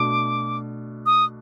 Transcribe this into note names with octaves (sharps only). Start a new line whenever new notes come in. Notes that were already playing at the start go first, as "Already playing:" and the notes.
Already playing: B2 A3 D4 D6
D#6